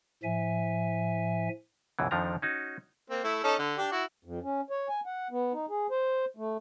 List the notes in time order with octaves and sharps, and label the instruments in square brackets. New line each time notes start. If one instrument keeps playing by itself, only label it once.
[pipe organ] A2 F3 E5 G#5
[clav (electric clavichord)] C#2 F#2 B2 E3
F2 D#3 F3 D4 A#5
C#4 D#4 F#4
[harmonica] A#3 C4
A3 E4
C#4 D#4 A4
D3
D4 G4
E4 F#4
[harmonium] F2
C#4
C#5
G#5
F#5
B3
D#4
G#4
C5
A3